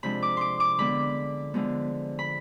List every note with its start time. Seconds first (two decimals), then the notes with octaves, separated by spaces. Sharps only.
0.03 C3 F3 G#3 D4 B5
0.22 D6
0.37 C6 D6
0.60 D6
0.78 D3 G#3 B3 D4 B5
1.54 D3 F3 G#3 B3
2.19 B5